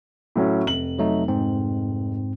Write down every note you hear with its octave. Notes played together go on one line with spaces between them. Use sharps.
A2 F#3 C#4
F1 F#7
F#3 A3 D#4
G#2 C4